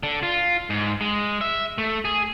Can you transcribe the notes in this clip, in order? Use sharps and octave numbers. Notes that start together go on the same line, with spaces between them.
D3
F4
G#2
G#3
E5
A3
G#4